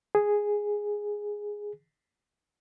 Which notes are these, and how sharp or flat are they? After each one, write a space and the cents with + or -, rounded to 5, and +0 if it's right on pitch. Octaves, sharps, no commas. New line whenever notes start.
G#4 -5